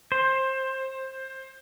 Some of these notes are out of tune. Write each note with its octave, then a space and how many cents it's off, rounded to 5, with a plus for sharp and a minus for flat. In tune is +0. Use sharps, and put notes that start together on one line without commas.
C5 +20